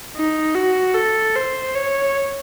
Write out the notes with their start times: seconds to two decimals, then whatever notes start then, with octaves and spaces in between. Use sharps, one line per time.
0.16 D#4
0.56 F#4
0.95 A4
1.36 C5
1.75 C#5